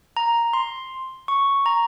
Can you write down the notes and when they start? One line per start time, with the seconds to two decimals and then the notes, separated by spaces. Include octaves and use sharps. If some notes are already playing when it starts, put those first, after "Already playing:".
0.17 A#5
0.53 C6
1.28 C#6
1.66 A#5